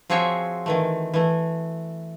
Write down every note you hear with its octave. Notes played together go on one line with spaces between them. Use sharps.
F3 C4 F#4 G#4 C#5 E5
D#3 E3 A3
E3 A3